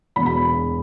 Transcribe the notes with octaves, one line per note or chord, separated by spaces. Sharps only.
E1 E2 B2 B5
B5